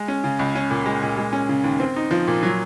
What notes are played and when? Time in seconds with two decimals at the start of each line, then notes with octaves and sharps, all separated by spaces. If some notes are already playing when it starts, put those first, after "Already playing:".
Already playing: G#3
0.08 C#4
0.24 C#3
0.39 C#2
0.55 C#4
0.70 A#2
0.86 G#3
1.02 A#2
1.18 G#3
1.33 C#4
1.49 C#3
1.64 D#2
1.80 C4
1.96 D#4
2.11 F3
2.28 A#2
2.43 F#3